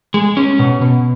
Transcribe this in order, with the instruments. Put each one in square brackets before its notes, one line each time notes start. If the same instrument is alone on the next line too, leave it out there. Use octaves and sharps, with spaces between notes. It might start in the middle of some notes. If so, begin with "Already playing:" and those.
[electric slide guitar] G#3
C#4
B2
B2